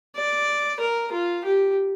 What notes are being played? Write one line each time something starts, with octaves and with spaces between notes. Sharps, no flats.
D5
A#4
F4
G4